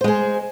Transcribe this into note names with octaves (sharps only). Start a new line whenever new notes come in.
G#3 G#4 C5